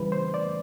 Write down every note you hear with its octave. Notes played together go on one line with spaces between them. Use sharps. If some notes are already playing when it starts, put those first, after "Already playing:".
Already playing: C#3 E3 G3 B4
C5
D5